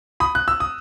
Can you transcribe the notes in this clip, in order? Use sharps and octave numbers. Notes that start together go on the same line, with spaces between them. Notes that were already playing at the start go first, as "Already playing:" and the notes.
B5 D#6
F#6
E6
D#6